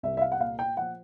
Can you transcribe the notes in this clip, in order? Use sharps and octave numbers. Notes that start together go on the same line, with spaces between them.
C2 E5
E5
F5
F#5
A#2 F5
G5
F3 F#5